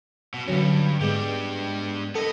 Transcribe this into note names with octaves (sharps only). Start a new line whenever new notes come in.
B2
E2 G2 D3 F#3 C#4
G#2 G#3 B3 D4 G4
B3 A4 D#5